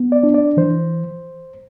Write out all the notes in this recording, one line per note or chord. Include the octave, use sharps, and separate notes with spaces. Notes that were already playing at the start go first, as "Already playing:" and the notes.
Already playing: B3
D5
D4
D5
E3 C5